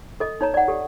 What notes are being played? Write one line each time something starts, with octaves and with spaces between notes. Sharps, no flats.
A4 D#5
D#4 C#5 A#5
D5 F#5
G4 A4